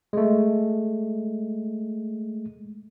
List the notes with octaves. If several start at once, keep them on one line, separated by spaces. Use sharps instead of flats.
G#3 A3